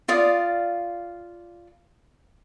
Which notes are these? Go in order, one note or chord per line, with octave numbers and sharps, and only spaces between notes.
F4 D5 F5 D#6